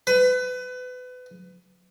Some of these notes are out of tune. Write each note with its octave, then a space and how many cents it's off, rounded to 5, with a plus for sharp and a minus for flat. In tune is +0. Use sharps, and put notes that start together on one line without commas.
B4 +30